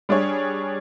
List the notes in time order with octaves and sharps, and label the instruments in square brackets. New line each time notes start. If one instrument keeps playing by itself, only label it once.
[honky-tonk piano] G3 D4 G#4 C#5